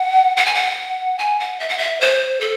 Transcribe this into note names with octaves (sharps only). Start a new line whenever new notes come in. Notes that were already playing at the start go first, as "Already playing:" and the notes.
Already playing: F#5
F#5
G#5
F#5
G#5
F#5
E5
F#5
E5
C5
A4